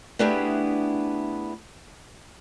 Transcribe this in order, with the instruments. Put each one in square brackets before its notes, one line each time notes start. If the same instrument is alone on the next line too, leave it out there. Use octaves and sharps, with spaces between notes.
[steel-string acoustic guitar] A3 B3 D4 E4 G4 G#4